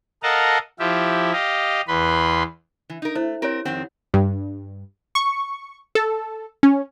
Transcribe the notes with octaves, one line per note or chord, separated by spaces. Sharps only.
A4 A#4 D#5 F5 F#5 A5
F3 E4 F4 G4 E5
G4 D#5 F5
E2 B4 B5 C6
E3
D#4 A#4
A3 E4 C5
C4 G4 A#4 C#5
F2 D#3 C4 F#5
G2
C#6
A4
C#4